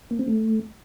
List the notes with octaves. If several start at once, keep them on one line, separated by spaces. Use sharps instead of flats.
A#3
C4
A3